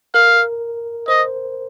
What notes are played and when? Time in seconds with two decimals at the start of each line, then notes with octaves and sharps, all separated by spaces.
0.14 A#4 F5
1.08 C5 D#5